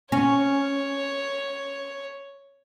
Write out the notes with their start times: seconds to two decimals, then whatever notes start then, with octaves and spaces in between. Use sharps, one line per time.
0.12 C#4 C#5